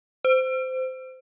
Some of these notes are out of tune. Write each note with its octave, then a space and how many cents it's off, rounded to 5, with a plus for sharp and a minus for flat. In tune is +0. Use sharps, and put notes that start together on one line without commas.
C5 -20